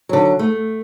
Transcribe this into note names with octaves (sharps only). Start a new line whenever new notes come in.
D3 F#3
A3